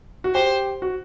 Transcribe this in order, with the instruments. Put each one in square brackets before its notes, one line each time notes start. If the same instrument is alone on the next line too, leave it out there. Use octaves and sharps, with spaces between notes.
[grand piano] F#4
[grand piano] G4 [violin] C5
[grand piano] F#4